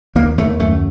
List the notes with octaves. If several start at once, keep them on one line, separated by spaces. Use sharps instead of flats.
D#2 A#3
D#2 A3
F#2 A3